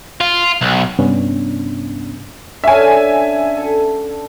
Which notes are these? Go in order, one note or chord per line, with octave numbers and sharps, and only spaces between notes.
F4
B1
G2 C3 B3 C#4 D4
D3 C#4 E5 G#5
A4